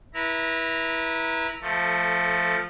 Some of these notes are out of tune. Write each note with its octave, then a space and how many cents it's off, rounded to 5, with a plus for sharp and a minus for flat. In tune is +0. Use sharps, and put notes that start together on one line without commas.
E4 -10 B4 -30 A#5 -5
F3 +0 A3 +0 A4 +20